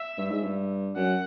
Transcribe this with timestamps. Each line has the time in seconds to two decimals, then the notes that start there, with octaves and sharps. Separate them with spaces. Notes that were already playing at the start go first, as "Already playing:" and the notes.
Already playing: E5
0.18 G2
0.30 G#2
0.43 G2
0.96 F#2 F#5